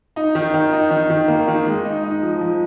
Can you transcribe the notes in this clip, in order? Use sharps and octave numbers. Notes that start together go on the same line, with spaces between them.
D#4
D#3
D#3
D#4
D#3
D#3
A#3
D#3
G#3
D#4
D#4
F3
F3